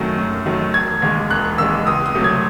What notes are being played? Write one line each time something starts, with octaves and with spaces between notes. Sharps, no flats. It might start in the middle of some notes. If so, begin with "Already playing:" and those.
Already playing: F#2 D#3 F#3 A3
F#2
D#3 F#3 A3
E1 G#6
D#2 D#3 G#3
E1 F#6
D#2 D#3 G#3 E6
C#2 D#6
D#6
C3 F#3 A3
G#6